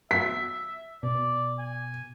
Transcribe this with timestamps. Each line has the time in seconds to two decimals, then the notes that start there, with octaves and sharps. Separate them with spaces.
0.11 E5 B6
1.03 B2 D5
1.59 G#5